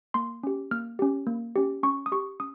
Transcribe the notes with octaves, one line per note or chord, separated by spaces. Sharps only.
A#3 C6
C#4 G4
A#3 F6
C#4 G4
A#3
C#4 G4
C#4 C#6
D#6
G4 C#6
C#4 D#6